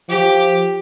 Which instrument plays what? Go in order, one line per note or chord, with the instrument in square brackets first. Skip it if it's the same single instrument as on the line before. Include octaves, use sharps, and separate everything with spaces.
[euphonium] F3 [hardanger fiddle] G4